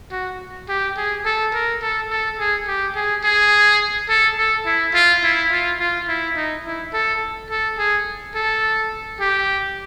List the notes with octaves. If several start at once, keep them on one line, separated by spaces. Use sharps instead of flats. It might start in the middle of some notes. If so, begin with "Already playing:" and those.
F#4
G4
G#4
A4
A#4
A4
A4
G#4
G4
G#4
G#4
A4
A4
E4
F4
E4
F4
F4
E4
D#4
E4
A4
A4
G#4
A4
G4